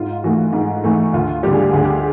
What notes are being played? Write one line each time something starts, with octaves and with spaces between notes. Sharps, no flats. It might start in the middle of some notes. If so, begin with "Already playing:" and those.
Already playing: G#2 F4
E3 A3 F#4
G#2
E3 A3
D2 F4
D3 G3 G4
G#4
G4
D2 G#4
G4